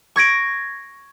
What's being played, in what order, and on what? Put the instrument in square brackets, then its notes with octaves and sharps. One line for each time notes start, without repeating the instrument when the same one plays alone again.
[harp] C#6 G#6 A#6 D7